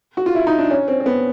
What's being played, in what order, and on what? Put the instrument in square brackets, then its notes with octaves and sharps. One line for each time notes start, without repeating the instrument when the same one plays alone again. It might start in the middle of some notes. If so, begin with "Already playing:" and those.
[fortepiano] F#4
F4
E4
D#4
D4
C#4
C4
C4
B3